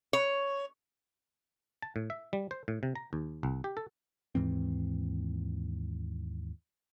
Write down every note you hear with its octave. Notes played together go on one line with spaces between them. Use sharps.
C#5
A5
A2
E5
G3
C5
A2
C3
A#5
D#2
C2
G4
A4
D#2 G#2 E3 C4